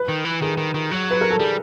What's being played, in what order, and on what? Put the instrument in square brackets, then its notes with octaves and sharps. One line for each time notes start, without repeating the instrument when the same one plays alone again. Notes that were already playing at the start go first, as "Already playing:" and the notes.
Already playing: [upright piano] B4
[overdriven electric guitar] D#3
E3
[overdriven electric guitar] D#3 [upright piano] G#4
[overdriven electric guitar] D#3
D#3
F#3
[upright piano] B4
A#4
A4
[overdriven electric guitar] G3 [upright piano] G#4